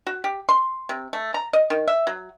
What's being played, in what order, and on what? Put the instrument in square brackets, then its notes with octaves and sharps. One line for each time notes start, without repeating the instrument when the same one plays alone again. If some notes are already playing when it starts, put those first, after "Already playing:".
[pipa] F#4
G4
C6
C3
A3
A#5
D#5
D#3
E5
F#3